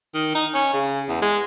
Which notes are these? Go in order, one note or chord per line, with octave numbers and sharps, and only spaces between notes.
D#3
D#4
C#4
C#3
E2
G#3